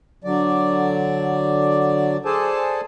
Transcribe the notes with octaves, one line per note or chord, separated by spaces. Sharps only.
D3 F#3 D5
G#4 A4 C5 D5 G#5 A5